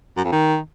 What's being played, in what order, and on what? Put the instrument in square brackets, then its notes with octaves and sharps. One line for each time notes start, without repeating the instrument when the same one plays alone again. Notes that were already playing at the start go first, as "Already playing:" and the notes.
[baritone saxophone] F#2
F2
D#3